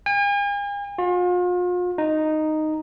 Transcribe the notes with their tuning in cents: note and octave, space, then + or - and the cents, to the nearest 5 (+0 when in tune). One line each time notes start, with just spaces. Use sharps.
G#5 -45
F4 +40
D#4 -5